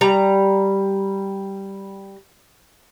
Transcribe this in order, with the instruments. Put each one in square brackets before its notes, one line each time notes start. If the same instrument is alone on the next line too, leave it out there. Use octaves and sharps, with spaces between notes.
[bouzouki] G3 A#5